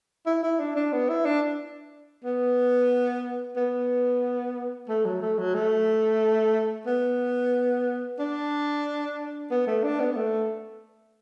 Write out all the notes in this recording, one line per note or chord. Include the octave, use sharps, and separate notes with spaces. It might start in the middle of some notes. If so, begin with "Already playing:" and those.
E4
E4
D4
D4
B3
E4
D4
B3
B3
A3
F#3
A3
F#3
A3
B3
D4
B3
A3
D4
B3
B3
A3